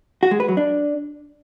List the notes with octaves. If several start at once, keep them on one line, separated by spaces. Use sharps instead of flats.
F#4
G#3
B4
F#3
D4